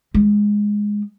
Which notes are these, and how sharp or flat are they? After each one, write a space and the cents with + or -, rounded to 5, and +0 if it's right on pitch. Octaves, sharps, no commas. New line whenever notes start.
G#3 -5